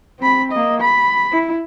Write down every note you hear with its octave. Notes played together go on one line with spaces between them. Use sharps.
C4 B5
A#3 D#5
B5
E4